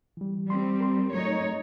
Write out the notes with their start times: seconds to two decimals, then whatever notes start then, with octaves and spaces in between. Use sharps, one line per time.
0.17 E3 G3
0.50 G3 C4 C6
0.80 A#4 C6
1.13 F#3 A3 D#4 C#5